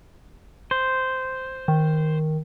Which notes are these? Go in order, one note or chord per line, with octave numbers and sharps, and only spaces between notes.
C5
D#3